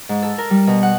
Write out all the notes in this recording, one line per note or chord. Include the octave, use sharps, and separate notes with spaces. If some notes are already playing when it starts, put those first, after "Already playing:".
G#2
A4
A#4
G3
B2
F#5